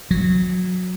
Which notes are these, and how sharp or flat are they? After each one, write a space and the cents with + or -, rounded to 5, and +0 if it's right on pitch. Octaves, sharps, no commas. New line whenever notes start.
F#3 -25